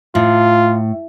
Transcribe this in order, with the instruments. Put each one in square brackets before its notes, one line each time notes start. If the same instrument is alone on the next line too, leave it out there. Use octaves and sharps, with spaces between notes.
[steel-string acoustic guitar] A2 [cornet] F4